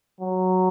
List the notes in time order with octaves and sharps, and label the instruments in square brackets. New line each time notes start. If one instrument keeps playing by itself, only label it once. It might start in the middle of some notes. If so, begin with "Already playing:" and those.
[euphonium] F#3